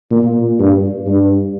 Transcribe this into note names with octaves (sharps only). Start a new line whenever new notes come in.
A#2
G2
G2